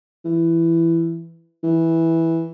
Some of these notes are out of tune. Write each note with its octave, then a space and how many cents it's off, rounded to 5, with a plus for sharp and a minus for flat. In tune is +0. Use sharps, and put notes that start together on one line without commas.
E3 +10
E3 -5